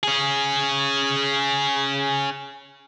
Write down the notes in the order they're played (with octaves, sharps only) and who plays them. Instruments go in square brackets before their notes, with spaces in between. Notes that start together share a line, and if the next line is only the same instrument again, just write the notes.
[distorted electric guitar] C#4 G#4